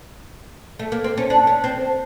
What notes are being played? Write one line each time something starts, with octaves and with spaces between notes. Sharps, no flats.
A3
A#3
C4
C#4
D4
C#4
C4